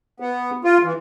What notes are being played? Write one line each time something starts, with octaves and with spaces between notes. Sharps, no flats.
B3
F4
E3